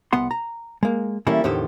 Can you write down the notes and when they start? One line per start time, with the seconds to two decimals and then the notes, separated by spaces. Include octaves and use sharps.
0.13 C2 B3 F#5 C6
0.31 A#5
0.83 G#3 A#3
1.27 E3 G3 A3 A#3 C#4 E4
1.44 E2 A2 D3 D#3 G4 C5